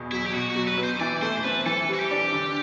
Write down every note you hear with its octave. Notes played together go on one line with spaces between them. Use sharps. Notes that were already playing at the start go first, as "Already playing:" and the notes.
Already playing: E2 B2
F#3 E4
G4
B2 F#4
F#4
F#3
B4
B3
C5
E3 D5
A3 C5
C5
C4 B4
E3 A4
G3
F#4
G4
D4
D3